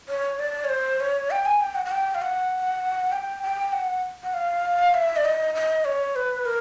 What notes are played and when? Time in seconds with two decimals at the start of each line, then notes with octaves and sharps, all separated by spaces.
0.09 C#5
0.39 D5
0.64 C#5
0.69 C5
1.00 C#5
1.31 G5
1.46 G#5
1.60 G5
1.75 F#5
1.85 F#5
1.91 G5
2.15 F5
2.22 F#5
3.12 G5
3.43 G5
3.73 F#5
4.23 F#5
4.34 F5
4.94 E5
5.17 D5
5.25 D#5
5.55 D#5
5.85 C#5
6.16 B4
6.46 A#4